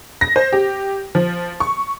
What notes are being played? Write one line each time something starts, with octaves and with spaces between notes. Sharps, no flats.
A#6
C5
G4
F3
C#6